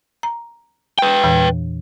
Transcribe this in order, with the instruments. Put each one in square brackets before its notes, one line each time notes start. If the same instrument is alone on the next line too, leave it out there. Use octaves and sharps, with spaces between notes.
[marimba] A#5
[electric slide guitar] B4 G5
[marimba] E2 A#2 E3